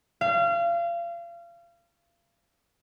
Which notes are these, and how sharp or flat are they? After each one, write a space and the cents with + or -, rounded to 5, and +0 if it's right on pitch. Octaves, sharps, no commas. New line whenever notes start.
F5 -30